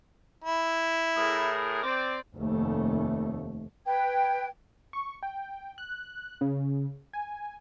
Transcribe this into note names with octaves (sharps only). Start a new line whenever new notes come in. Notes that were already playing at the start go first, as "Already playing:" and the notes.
E4
A2 G#4 A#4
C4 D5
F1 D#2 A3
B4 G5 G#6
C#6
G5
F#6
C#3
G#5